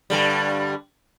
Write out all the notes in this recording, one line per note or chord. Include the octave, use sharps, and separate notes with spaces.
G2 D3 G3